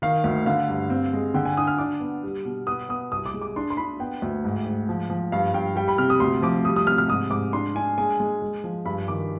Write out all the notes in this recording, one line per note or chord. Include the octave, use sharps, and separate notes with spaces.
D#3 F5
D2
D3 F5
G2
C4
G#3
D3 G5
G#5
D4 D#6
F6
D4 D6
B3
G3
B2
B3 D#6
B3 D#6
C2 D#6
D6
G#3
D6
D4 C6
C6
D4 B5
B3 G5
D2
G#2
G#2
F3
F3
G2 F5
G2 G5
G3 G5
B5
C3 F6
D#6
D2 C6
F3 D6
G3 D#6
D#6
C3 F6
F6
G#2 D#6
G#2 D6
D4 C6
D4 G#5
G#3 G#5
G#3
G#3
F3
G2 B5
D#3 D6